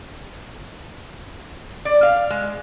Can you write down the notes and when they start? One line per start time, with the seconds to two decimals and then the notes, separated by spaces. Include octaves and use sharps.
1.85 D5
2.03 F5
2.30 G#3